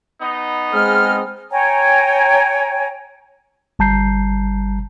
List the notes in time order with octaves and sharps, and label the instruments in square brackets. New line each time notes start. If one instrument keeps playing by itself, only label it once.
[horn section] B3 D#4
[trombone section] G#3 C4 G#4 [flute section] F6
[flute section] C#5 G5 G#5 A#5
[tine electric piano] G1 G3 A5 A#5 G6 C7